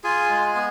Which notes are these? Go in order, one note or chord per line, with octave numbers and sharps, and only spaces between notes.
F4 G#4 G#5
G#3
B3